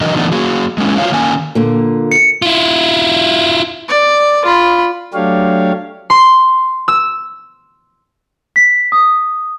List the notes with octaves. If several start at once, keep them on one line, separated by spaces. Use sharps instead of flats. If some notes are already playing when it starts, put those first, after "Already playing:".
E3 F#3 D4 D#4 A#4 D#5
E3 A3 B3 D4 D#4
A#3 F#4 G#4
G#3 A#3 B3 C#4 E4
F4 F#4 G#4 B4 C#5 F5
D#3 A#3 C#4 G#5
A#2 D3 A#3
C#7
E4 F4
D5
F4 B5
F#3 A3 D4 G4 C#5 F5
C6
E6
B6
D#6